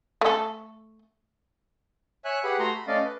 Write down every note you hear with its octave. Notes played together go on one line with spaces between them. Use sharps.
A3 A4
C#5 E5 G#5 F#6
G4 G#4 B4 F#5 B5
A3 F#4 A#5 C6
B5
A3 C#4 D5 D#5 F5
B4